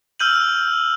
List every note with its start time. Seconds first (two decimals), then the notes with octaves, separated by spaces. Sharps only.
0.19 E6 F6 G6 D#7 F#7